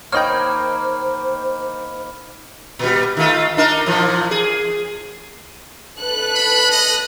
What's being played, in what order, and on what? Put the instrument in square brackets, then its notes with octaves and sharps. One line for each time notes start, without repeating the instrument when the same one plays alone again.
[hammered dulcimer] D#3 A#3 [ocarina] C5 [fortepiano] C#5 D#5 G5 [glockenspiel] B5 F6
[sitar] A#2 G3
D#3 A3 F4
D4 D#4 A#4
A#2 E3 F3
G#4
[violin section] A4 B4 F#6
[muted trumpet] B5
D#5